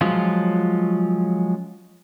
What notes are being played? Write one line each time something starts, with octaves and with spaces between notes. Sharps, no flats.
F3 F#3 G#3 C#4 F4